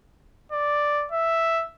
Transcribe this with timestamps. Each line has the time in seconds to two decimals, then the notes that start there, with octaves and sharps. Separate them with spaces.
0.52 D5
1.12 E5